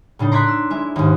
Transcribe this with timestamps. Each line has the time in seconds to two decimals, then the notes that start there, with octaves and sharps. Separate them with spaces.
0.19 A2 C#3 D4 D#4
0.32 A#5 C6 D6 F#6 G#6 B6
0.48 E6
0.70 G#3 E4 E5
0.96 D#2 G#2